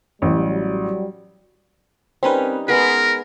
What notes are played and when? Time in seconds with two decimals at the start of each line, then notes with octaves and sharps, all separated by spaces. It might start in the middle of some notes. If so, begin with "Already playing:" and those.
0.22 A1 F#3 G3
2.23 G3 C4 C#4 D#4 A#4 B4
2.68 G#3 B3 G#4 A#4 B6